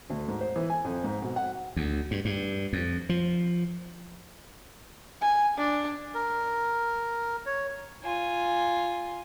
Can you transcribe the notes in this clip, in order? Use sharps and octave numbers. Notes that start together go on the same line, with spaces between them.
D2
G#2
C5
E3
G#5
F2
G#2
B2
F#5
D2
G2
G2
F2
F3
G#5
D4
A#4
C#5
F4 G#5